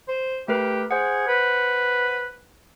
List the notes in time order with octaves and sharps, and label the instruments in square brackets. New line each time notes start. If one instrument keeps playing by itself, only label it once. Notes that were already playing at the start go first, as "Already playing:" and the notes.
[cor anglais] C5
[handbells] A3 A#4 B4 [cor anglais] G4
[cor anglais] G#4 [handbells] C5 F#5
[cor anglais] B4